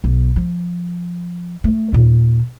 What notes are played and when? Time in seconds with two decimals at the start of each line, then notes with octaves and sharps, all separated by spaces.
0.04 B1
0.36 F3
1.64 A3
1.93 D#2 A#2